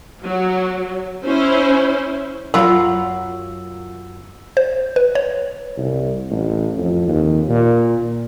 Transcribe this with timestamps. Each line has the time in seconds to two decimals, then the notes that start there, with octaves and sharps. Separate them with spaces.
0.24 F#3
1.25 C#4 E4 C5
2.54 F#2 F#3 F4 B5 E6
4.57 C5
4.96 B4
5.15 C#5
5.78 C2
6.31 A1
6.77 F2
7.08 D#2
7.48 A#2